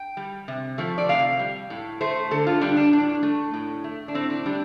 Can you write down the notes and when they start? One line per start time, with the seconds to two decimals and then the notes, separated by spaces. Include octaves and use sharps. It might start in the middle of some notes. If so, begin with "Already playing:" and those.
Already playing: G5
0.17 G3
0.48 C3
0.78 F3 A3
0.98 D5
1.09 C3 F5
1.39 G3
1.70 A2
2.01 A3 C5
2.31 D3 A4
2.47 F4
2.61 G3 D4
2.77 D4
2.92 A2 D4
3.23 A3
3.54 A2
3.84 A3
4.08 D4
4.14 A2 C4
4.30 D4
4.46 G3 D4